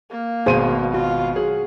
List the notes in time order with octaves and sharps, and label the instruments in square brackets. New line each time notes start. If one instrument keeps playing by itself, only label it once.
[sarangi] A#3
[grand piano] G#1 B2 D#7 [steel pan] G#4 C5
[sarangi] F4 [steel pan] F#4
[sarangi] F#3 [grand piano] G#4